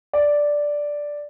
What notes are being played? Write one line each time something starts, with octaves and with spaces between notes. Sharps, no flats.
D5